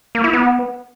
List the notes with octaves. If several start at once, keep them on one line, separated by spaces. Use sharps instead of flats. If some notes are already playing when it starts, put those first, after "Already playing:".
A#3
E4
B3